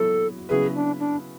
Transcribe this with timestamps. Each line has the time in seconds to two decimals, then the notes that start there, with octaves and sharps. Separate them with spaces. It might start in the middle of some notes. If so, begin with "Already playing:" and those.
Already playing: F#3 B3 E4 A4
0.49 C#3 F#3 B3 E4 G#4 B4
0.75 D4
0.99 D4